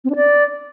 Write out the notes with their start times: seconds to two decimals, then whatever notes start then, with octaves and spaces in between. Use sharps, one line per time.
0.05 C4
0.10 D4
0.16 D5